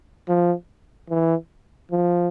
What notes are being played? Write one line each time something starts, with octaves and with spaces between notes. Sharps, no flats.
F3
E3
F3